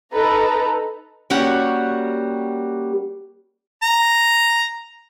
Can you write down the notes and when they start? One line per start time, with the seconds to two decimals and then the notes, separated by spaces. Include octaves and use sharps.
0.13 D#4 A4 B4 A#5
1.30 G3 A#3 C#4 F#4 G4 F#5
3.83 A#5